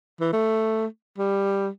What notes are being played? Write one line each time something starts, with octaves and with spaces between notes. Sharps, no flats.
E3
A3
G3